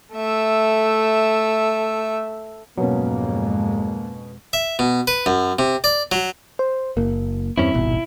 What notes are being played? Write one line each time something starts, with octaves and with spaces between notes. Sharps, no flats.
A3 E5
F2 G#2 B2 F#3 G#3 A#3 B3 C#4
E5
B2
B4
F#2
C3
D5
F#3
C5
F#1 A#3
E2 G2 C4 C#4 E4
D#1 G#1 B2